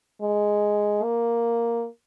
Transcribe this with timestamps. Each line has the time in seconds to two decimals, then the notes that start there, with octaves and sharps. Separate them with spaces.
0.22 G#3
1.03 A#3